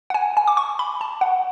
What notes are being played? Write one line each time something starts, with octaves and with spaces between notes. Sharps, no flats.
F#5
G#5
G#5
D6
C#6
B5
A5
F#5